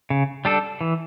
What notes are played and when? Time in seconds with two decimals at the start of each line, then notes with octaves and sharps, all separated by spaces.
0.10 C#3
0.45 G3 D4 A4
0.81 E3